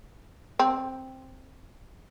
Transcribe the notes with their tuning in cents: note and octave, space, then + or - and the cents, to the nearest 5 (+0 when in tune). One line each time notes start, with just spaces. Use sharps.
C4 +5